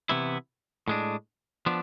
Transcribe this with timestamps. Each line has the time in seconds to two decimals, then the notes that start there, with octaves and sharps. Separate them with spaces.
0.09 C3 E3 B3 E4
0.88 A2 G#3 D4
1.66 F3 B3 D4